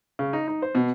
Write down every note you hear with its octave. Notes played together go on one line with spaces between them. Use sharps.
C#3
D#4
D#4
C5
B2